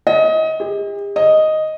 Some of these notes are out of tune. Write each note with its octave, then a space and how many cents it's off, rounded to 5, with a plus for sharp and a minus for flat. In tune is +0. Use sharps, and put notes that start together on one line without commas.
D#5 +25
G4 +45
D#5 +0